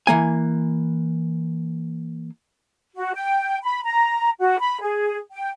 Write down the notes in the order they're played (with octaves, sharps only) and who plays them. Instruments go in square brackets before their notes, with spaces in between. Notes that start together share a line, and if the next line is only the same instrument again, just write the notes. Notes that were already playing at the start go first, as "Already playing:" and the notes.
[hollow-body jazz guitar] E3 A#3 G#5
[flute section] F#4
G5
B5
A#5
F#4
B5
G#4
G5